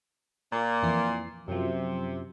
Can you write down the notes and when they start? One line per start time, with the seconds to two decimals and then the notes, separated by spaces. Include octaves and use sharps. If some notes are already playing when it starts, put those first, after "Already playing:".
0.53 A#2 A#3
0.83 F2 E3 C7
1.48 F#2 C3 F3